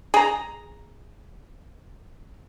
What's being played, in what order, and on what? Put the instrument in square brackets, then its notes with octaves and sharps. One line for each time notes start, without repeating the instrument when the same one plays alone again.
[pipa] G#4 A#5